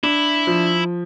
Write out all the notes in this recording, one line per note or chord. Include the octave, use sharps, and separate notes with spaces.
D4 E4
F3